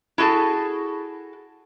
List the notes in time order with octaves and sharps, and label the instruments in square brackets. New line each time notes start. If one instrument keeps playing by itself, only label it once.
[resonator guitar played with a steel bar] E4 F#4 G#4 A4